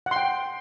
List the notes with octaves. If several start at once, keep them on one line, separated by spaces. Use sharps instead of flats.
F#5
C6
G5